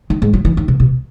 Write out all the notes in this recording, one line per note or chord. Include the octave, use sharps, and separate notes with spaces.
D#3
G#2
F#3
E3
D#3
B2
B2